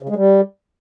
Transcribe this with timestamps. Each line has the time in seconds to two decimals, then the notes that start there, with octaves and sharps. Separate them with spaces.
0.02 C#3
0.09 G#3
0.16 G3